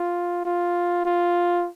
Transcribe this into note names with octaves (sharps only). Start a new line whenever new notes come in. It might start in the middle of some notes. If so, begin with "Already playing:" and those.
Already playing: F4
F4
F4